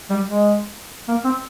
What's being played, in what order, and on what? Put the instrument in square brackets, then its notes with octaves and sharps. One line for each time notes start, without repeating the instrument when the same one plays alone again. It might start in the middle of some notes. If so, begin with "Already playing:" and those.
[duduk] G3
G#3
A#3
C4